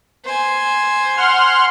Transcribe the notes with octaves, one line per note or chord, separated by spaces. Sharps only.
C5 G#5
F#5 C6 F6